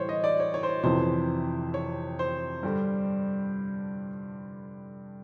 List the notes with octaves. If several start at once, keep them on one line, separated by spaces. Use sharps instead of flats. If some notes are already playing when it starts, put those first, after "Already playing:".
Already playing: A2 E3 G3 C5 C#5
D#5
D5
C#5
C#5
C5
C#5
F2 C3 E3 C5
C#5
C5
G2 D3 G3